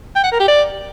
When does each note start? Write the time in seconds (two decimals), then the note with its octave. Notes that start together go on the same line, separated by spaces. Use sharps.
0.16 G5
0.24 F#5
0.32 A#4
0.40 G4
0.48 D5